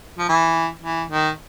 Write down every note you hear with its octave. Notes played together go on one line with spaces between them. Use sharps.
F3
E3
E3
D#3